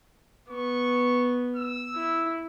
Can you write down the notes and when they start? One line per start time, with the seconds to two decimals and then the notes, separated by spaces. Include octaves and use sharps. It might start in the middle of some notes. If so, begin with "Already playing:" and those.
0.48 B3 C#6
1.56 E6
1.95 E4